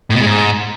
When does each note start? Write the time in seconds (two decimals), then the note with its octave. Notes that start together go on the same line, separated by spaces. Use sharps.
0.10 A2
0.15 B2
0.20 G#3
0.26 G#2